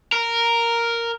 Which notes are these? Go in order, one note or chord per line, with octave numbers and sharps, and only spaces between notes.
A#4